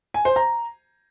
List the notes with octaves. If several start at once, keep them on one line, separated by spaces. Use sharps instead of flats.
G#5
C5
A#5